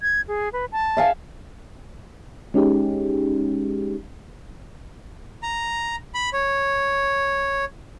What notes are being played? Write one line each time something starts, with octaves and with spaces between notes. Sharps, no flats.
G#6
G#4
B4
A5
E5 F5 G#5
G#3 C#4 D#4 G4 G#4
A#5
B5
C#5